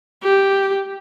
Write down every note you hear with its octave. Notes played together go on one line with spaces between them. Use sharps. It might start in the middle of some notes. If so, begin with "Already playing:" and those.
G4